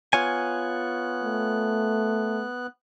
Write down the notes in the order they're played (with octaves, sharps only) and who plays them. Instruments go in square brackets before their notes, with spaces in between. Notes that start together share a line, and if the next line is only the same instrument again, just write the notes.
[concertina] B3 F#6 [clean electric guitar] F4 C#5 G#5
[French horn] A3